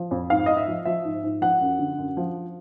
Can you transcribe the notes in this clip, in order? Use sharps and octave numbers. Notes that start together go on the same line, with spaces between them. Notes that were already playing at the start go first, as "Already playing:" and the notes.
Already playing: F3
F2
G#2 F5
G#2 D#5
E5
F3
F3 E5
G#2
G#2
F3 F#5
F#2
D3
F#2
F3